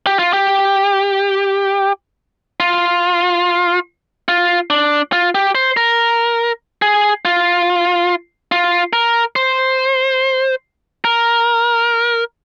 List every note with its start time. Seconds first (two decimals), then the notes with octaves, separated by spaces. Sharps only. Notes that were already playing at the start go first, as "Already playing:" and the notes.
0.06 G4
0.19 F4
0.33 G4
2.60 F4
4.28 F4
4.70 D4
5.13 F4
5.35 G4
5.55 C5
5.77 A#4
6.82 G#4
7.25 F4
8.52 F4
8.93 A#4
9.36 C5
11.05 A#4